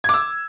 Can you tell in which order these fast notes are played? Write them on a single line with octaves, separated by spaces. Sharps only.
G#6 D6 E6